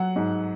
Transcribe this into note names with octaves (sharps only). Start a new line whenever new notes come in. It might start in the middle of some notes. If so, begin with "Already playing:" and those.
Already playing: F#3 F#5
G#2